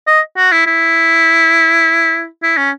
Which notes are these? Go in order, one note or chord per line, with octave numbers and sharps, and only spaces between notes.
D#5
F#4
E4
E4
E4
C#4